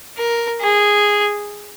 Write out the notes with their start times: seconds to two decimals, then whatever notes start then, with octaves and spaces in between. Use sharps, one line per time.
0.17 A#4
0.61 G#4